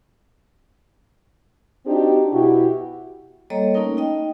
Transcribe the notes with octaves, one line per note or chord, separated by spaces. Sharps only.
C4 D4 D#4 F#4 G4
B2 E4 F#4 G4
G3 A#3 A4 C#5 D#5 A#5
A3 A#3 C#4 D#4 A#4
D#4 D#5 G5